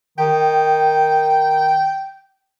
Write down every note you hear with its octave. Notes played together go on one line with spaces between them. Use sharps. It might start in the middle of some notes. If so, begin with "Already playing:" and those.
D#3 G5